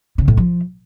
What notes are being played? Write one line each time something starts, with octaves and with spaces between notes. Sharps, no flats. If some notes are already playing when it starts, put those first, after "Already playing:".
C#3
A2
F3